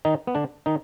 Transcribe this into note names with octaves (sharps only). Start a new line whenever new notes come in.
D#3 D#4
B3
D3 D4
D#3 D#4